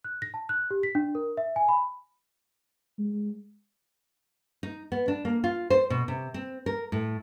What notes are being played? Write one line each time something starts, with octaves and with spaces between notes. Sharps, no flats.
F#6
A#6
A5
F#6
G4
B6
D4
A#4
E5
G#5
B5
G#3
D#4
B3
D4
A#3
F4
C5
B2
C3
C4
A#4
A2